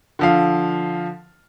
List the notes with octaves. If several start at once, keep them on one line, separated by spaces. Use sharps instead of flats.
D3 F3 F5